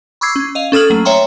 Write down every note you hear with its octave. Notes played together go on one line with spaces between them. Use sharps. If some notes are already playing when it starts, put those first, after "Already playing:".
B5 C#6 D6 E6 G#6 C7
C#4
D#5 F5
C#4 A4 D#6 F6 F#7
F#3 A3 A#3
C#5 E5 G5 A#5 C6